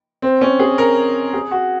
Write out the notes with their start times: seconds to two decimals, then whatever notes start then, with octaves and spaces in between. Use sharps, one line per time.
0.22 C4
0.41 C#4
0.59 G#4
0.78 A#4
1.33 G#4
1.51 F#4